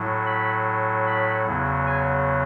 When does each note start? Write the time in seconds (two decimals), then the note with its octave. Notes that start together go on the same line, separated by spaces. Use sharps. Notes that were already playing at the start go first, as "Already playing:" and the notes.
Already playing: A2 F#3
0.26 B5
1.07 B5
1.46 E2 C#3 F#3
1.86 G#5